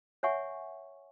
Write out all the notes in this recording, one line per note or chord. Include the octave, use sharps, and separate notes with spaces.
C#5 E5 F#5 G#5 C#6